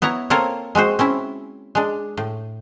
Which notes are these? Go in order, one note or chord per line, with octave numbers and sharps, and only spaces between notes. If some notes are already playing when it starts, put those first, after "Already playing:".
B3 E4 C#5 A#5
A#3 C4 F4 A4 A#4 C#5
G#3 C4 F#4 C5
C4 C#4 E4
G#3 D4
A2